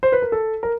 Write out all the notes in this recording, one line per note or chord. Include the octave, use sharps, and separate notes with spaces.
C5
B4
A#4
A4
A#4